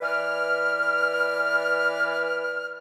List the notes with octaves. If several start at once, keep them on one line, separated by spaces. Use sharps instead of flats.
E3 B4 D5 F6